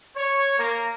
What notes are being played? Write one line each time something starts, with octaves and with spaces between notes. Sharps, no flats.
C#5
A#3